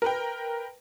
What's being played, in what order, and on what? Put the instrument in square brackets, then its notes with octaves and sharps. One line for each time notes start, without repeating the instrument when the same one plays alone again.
[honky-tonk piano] A#4 B4 G5